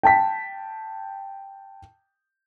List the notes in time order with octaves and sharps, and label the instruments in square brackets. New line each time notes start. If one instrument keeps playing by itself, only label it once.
[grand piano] G5 A5 B6